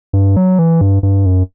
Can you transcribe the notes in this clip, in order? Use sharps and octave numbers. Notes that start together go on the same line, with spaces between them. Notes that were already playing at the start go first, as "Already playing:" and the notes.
G2
F#3
E3
G2
G2
F#2